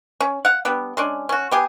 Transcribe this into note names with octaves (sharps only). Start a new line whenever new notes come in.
C#4
F5 F#5
G3 B3 D4
G#3 C#4 D4
C#4 F#4
B3 G4 G#4